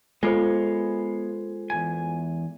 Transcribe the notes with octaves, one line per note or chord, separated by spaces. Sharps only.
G#3 B3 F4 A4 C5 C#5 F5
E2 G#2 G#5